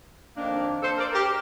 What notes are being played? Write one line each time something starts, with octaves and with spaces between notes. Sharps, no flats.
F2 D#3 A#3 D4
A4 C5
A#4 D5
G4 A#4